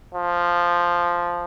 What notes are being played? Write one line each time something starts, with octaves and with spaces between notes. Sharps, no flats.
F3